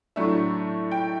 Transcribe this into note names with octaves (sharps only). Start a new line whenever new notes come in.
A2 F#3 A3 D4 E5
G5